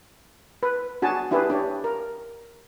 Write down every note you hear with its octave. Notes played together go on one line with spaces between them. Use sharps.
B4
D4 F#4 G#4 G#5 A5
D4 E4 G4 G#4 B4
D4 G4 C#5
A#4